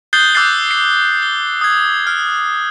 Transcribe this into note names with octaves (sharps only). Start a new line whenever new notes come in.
D#6 F#6 G6 A6 C7 G7
D6 E6 F#6 G6 A6 C7
C7
G7
D#6 G#6
F6